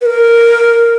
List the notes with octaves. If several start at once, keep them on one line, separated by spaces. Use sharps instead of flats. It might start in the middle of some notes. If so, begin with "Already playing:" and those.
B4
A#4